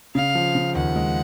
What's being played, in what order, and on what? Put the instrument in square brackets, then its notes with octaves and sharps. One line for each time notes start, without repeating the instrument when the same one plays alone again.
[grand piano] C#3 [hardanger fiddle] F5
[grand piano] F3
C#3
[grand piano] D#2 [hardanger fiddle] F#5
[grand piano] G#3